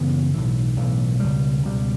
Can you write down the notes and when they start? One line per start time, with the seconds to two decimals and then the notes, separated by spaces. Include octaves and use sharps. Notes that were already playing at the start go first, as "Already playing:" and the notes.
Already playing: F#2 C#3 E3 B3
0.34 B1 A2 E3
0.76 B1 A2 E3
1.19 C#2 B2 G3
1.63 C#2 B2 G3